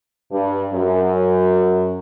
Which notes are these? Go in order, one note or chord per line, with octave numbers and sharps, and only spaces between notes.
G2
F#2